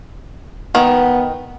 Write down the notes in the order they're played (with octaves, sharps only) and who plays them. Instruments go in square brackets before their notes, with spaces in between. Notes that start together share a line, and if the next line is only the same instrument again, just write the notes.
[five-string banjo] D#3 [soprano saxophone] B3